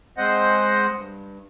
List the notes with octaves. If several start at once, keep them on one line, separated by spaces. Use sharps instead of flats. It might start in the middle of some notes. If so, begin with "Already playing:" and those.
G#3 C4 C5 D#5 F#5
G2